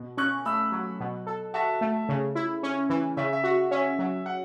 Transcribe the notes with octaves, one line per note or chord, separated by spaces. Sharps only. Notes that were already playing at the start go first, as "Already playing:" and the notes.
Already playing: B2
C#4 C#6 F#6
A3 B5 E6
F#3
B2
A4
F#4 E5 A5
A3
C#3
E4
C#4
E3
C#3 E5
E5
F#4
C#4 E5
F#3
F#5